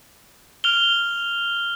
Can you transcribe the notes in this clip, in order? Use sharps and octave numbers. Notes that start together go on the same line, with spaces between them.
F6 F7 G7